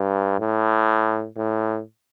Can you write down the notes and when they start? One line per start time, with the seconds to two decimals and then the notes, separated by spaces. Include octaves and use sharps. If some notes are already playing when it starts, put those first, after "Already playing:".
Already playing: G2
0.40 A2
1.37 A2